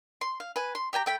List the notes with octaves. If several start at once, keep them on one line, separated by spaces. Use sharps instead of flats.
C6
F5
B4 G#5
C6
G4 G5 G#5 A#5
A3 G5 B5